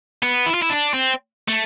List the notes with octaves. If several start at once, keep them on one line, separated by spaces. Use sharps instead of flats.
B3
E4
F4
E4
D4
C4
A3